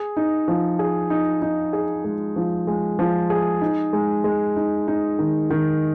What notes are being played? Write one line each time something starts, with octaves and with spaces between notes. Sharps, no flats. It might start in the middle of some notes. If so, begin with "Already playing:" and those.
Already playing: G#4
D#4
F3
G#4
D#4
D#4
G#4
G#3
F3
G#3
F3
G#4
D#4
G#3
G#3
D#4
D#4
D#3
D#3